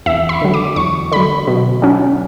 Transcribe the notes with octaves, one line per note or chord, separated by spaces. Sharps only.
E2 E5
B5
D3 F#3
D6
E2 C#6
D3 F#3 B5
B2
F#3 C#4